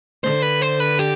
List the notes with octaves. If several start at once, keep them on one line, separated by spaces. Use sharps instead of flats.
D3 C5
B4
C5
B4
G4